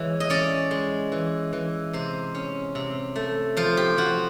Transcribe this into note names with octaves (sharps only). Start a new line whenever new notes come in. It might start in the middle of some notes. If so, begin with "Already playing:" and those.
Already playing: E3 G#3 C#5
D#5
C#4 D5
G#3
E3
E3
C3 C5
C#4
C3
A3
F3 C5
G4
F3 F#4